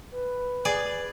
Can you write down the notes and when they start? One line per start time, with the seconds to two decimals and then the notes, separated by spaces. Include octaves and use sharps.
0.12 B4
0.65 G#4 D5